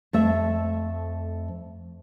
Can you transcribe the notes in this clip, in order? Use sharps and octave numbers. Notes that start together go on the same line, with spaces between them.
F2 A3 E5